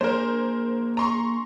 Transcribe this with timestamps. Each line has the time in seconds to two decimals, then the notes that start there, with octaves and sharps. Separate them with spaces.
0.01 A#3 D4 G#4 A#4 C5
0.97 A#5 C6 C#6